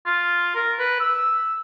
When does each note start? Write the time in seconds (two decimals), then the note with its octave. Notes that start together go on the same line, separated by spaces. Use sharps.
0.06 F4
0.55 A#4
0.79 B4
1.00 E6